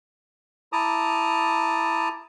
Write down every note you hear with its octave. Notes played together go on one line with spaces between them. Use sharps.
E4 A5 A#5 D6 D#6